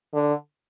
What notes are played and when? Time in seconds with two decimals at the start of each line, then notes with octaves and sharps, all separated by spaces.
0.14 D3